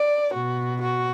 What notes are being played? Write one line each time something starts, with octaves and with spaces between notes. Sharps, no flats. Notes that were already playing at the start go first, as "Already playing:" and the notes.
Already playing: D5
B2 F#4
F#4